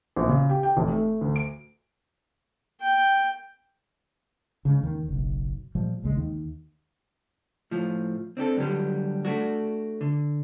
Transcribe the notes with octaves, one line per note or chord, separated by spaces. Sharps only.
A#1
C#3
G4
G5
F1
A3
D2
D7
G5
C#3 G#3
D#2 D#3
F#1 B1
A#2 F3 G3 G#3
A#1 D#2 C#3 G#3
D#2 D#3
A2 F3
C4 D4 G4 A4
G2 D3 D#3 F#3 G3
A3 D4 F#4
D3